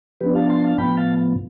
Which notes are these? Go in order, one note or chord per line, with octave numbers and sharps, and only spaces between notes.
F3 B3 D4 G4 B4
F5 A5
A5 C6
F5 A5
A2 F3 B3 G5 B5
F5 A5